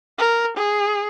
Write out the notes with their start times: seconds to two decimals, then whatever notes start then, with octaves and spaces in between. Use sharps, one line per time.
0.18 A#4
0.57 G#4